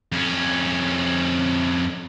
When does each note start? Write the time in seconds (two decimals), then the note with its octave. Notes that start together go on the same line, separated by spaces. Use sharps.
0.12 F2 C#4